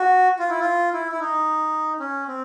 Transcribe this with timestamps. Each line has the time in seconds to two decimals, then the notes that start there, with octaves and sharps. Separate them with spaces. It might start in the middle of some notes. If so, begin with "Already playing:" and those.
Already playing: F#4
0.39 F4
0.49 E4
0.60 F4
0.93 E4
1.12 E4
1.20 D#4
2.00 C#4
2.28 C4